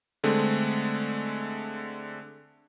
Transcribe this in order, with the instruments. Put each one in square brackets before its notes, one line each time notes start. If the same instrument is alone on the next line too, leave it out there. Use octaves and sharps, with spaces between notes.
[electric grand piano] D3 G#3 A3 C4